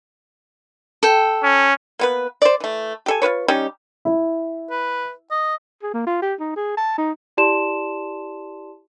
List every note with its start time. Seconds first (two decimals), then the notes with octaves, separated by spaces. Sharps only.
1.03 A4 G5
1.43 C#4
1.99 A#3 B3 B4
2.42 C5 D5
2.60 E3 A3
3.06 G4 A4 G#5
3.22 F4 F#4 B4 C#5
3.48 G3 C#4 D#4 G4
4.05 E4
4.71 B4
5.31 D#5
5.83 G#4
5.94 A#3
6.07 F4
6.22 G4
6.40 D#4
6.57 G#4
6.77 A5
6.98 D#4
7.37 E4 G4 D5 A5 C6 E7